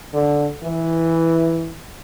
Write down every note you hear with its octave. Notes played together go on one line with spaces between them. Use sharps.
D3
E3